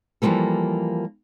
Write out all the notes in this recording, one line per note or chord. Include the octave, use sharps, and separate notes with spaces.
E3 F3 G3 G#3 A#3 A4